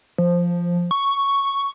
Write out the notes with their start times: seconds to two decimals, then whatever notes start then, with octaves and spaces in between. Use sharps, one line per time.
0.18 F3
0.91 C#6